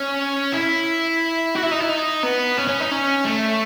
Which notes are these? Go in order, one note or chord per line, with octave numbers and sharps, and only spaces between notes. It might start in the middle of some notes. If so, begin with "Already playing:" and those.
Already playing: C#4
E4
F#4
E4
D#4
E4
D#4
B3
C#4
C#4
D#4
C#4
A3